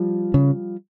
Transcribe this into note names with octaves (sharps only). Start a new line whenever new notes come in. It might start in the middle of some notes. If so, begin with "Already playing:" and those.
Already playing: F3 G3
C#3